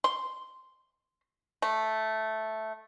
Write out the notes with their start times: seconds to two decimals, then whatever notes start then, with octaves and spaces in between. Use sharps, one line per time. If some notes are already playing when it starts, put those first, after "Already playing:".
0.04 C6
1.62 A3